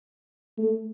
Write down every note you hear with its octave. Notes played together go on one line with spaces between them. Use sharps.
A3